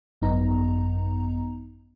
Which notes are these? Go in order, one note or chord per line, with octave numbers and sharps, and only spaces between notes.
G#1 F#2 B3 D#4 A#5